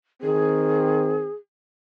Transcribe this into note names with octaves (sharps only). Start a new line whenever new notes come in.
D#3 C4 G#4